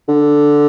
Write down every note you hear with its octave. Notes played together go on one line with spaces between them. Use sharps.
D3